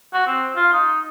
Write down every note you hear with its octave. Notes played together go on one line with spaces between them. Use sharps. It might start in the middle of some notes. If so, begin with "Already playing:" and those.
F#4
C4
F4
D#4